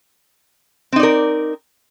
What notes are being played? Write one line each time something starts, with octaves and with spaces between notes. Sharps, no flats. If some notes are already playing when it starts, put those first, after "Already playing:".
C4 D#4 A#4 D5